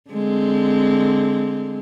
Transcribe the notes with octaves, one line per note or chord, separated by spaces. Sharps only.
D3 G#3 C4